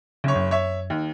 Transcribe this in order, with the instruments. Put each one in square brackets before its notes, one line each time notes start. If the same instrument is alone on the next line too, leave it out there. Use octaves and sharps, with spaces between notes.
[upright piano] F#1 C#5 [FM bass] C#3
[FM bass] F#2
[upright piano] C#5 E5
D#2